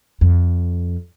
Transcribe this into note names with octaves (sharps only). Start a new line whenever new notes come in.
F2